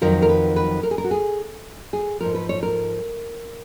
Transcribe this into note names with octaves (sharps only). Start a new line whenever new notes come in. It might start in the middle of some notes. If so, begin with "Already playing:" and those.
F2 D#3 F#3 A#4
A#4
B4
B4
A#4
G#4
A#4
F#4
G#4
G#4
G#2 F3 A#4
B4
C#5
A#4